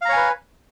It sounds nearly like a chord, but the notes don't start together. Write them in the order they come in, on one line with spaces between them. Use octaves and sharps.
F5 A#5 C#5 G#5 B4